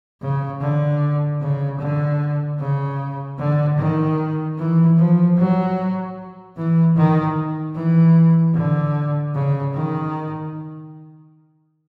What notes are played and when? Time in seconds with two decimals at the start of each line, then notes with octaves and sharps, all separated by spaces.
0.21 C#3
0.61 D3
1.41 C#3
1.79 D3
2.59 C#3
3.39 D3
3.78 D#3
4.58 E3
4.97 F3
5.37 F#3
6.57 E3
6.96 D#3
7.75 E3
8.54 D3
9.34 C#3
9.74 D#3